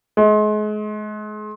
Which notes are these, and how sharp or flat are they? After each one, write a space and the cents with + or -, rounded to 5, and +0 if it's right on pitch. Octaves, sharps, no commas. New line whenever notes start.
G#3 +35